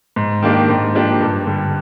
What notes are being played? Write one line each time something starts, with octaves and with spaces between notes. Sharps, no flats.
G#2
D#3 A#3 D4 G4
G#2
F3 A#3 D4 G4
G2
D3 G3